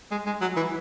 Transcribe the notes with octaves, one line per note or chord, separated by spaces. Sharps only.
G#3
G#3
F#3
E3